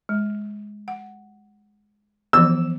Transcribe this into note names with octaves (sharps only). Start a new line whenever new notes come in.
G#3
F#5
E3 F3 B3 E6